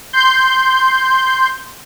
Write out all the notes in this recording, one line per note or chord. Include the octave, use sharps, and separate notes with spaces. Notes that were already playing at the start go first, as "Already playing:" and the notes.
C6 G6